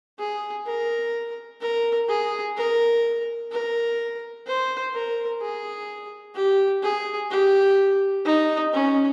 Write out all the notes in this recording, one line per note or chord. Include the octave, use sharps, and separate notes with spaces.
G#4
A#4
A#4
G#4
A#4
A#4
C5
A#4
G#4
G4
G#4
G4
D#4
C#4